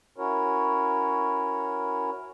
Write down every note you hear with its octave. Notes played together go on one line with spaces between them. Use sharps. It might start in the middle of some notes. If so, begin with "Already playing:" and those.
C#4 E4 F#4 A#4 C#5